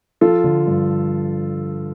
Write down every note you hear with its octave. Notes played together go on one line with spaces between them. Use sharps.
F3 F4 A4
D3
G2